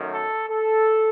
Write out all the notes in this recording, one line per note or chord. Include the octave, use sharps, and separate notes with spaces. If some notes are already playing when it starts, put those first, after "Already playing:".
Already playing: F#2 D#3 A3
A4
A4